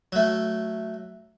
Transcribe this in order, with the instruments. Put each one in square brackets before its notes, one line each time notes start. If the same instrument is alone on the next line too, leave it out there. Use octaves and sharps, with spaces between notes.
[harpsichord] F#3 A3